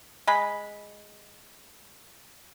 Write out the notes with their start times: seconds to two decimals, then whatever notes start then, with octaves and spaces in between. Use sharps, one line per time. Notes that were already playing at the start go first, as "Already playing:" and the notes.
0.27 G#3 B5